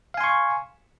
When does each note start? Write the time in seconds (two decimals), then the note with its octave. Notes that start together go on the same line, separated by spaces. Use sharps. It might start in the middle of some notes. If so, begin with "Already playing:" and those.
0.14 F5
0.17 G#5
0.21 C6
0.24 C#6